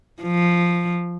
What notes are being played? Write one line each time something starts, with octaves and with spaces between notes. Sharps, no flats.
F3